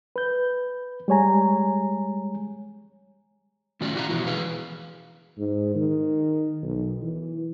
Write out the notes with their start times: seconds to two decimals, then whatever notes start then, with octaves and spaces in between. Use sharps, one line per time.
0.16 B4 G6
1.08 G3 G#3 C#5 G#5 A#5
3.81 A2 D#3 C#4 F4 F#4 D5
3.95 E4 F#4 G4 E5 F5 A#5
4.09 E3 F3 B3 E4 F#4
4.27 E3 G#4 B4 F5
5.38 G#2
5.75 D#3
6.62 B1
7.03 E3